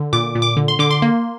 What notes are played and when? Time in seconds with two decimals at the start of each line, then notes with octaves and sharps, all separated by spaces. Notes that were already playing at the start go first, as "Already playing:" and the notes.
Already playing: D3
0.13 A#2 D6
0.35 A#2
0.42 D6
0.57 D3
0.68 C6
0.79 D3 D6
0.91 C6
1.02 A#3